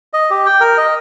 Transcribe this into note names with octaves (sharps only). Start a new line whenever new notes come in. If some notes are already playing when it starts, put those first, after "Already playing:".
D#5
G4
G5
A#4
D#5